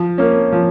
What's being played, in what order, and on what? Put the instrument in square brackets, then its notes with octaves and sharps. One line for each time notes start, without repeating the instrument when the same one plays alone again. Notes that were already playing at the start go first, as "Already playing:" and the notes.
Already playing: [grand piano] F3
A#3 C#4
F3